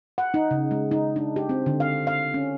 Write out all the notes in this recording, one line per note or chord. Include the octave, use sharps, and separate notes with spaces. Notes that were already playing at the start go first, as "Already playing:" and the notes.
F#5
D#4
C#3
G#3
D#4
D4
G4
C4
D3
F5
F5
C#4